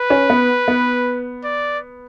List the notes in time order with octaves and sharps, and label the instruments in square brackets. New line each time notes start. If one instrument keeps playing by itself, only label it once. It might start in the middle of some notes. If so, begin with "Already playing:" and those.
Already playing: [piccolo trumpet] B4
[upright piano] C#4
B3
B3
[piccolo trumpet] D5